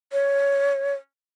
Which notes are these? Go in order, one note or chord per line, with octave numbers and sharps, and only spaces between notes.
C#5